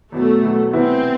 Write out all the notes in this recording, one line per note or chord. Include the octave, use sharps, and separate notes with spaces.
E2 B2 F#3 A3
E2 B2 F#3
C3 E3 B3 C4 E4